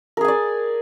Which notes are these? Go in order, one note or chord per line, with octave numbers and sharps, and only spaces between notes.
G#4 A#4 D5 G#5